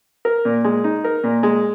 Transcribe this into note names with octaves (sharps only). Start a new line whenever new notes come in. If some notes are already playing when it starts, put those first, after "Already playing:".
A#4
A#2
G#3
D#4
A#4
A#2
G#3